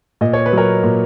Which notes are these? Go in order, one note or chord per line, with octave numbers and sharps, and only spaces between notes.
A#2 D#5
C#5
B4
F#3 A#4 C#5
A#2